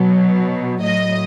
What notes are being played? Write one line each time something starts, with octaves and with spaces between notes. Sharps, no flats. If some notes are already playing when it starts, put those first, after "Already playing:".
Already playing: B2 F#3
A2 F#3 D#5